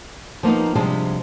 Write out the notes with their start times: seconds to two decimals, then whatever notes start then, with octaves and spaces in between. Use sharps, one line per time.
0.43 F3 A#3 B3 D#4
0.75 C3 F3 G3 G#3 D4